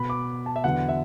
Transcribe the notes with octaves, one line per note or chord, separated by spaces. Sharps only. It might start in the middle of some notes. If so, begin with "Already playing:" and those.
Already playing: B2 B3 B5
D6
A5
E5
E2 D3 F#3 B3 F#5
E5